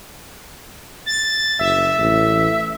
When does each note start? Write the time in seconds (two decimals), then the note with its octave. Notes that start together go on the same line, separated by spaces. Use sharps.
1.06 A6
1.59 F#1 E5
1.98 A1